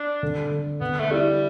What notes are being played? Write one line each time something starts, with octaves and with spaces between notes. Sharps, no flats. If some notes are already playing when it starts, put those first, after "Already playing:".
Already playing: D4
D3
D3
D3 B3
A3
G3 E4